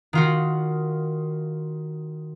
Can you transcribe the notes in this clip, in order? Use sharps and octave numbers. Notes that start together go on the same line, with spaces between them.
D#3 F4 F#4